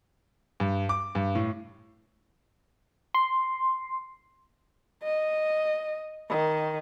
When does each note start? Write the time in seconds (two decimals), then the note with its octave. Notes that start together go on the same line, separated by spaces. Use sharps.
0.60 G2
0.89 D6
1.15 G2
1.35 A2
3.15 C6
5.03 D#5
6.30 D#3